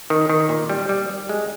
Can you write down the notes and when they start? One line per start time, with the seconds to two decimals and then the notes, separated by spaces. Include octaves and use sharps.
0.10 D#3
0.30 D#3
0.49 A#2
0.70 G3
0.89 G3
1.10 G3
1.29 G#3